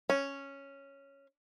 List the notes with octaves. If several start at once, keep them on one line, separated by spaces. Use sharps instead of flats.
C#4